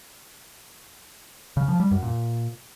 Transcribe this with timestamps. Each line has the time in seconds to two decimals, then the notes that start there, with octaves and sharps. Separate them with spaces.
1.57 C#3
1.68 F3
1.80 G3
1.91 F#2
2.03 A#2